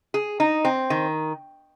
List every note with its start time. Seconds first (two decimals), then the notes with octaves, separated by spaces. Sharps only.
0.14 G#4
0.40 D#4
0.65 C4
0.90 D#3